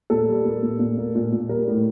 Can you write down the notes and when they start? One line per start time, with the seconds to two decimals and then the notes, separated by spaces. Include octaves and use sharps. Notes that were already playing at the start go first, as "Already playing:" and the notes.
0.10 A#2 A4
0.28 G3
0.45 A#3
0.63 A#2
0.79 A#2
0.98 A#3
1.15 A#2
1.32 A#2
1.49 G3 A#4
1.67 A2